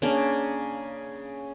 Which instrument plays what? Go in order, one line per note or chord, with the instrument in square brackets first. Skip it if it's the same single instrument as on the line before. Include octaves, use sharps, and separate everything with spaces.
[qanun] C#3 A#3 D4